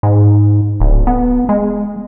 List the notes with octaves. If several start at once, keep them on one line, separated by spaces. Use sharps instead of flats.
G#2
D1
B3
G#3